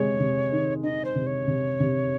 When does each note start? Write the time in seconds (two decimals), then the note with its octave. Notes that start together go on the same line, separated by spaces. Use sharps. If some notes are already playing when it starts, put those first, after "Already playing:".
Already playing: C3 G#3 C#5
0.20 C3
0.52 D#3
0.83 D#4 D#5
1.05 C5
1.15 C3
1.27 C#5
1.47 C3
1.80 C3